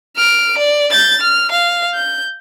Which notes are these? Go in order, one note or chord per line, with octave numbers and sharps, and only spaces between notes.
F6 D7
D5
G6 A6
F6
F5
G6